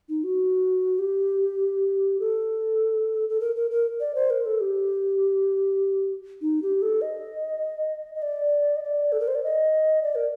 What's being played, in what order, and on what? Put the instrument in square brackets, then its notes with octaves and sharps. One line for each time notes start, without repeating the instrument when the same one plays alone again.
[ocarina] D#4
F#4
G4
A4
A4
A#4
A#4
A#4
D5
C5
A#4
A4
G4
D#4
G4
A4
D#5
D#5
D5
D#5
D5
A4
A#4
C5
D5
D#5
D5
A#4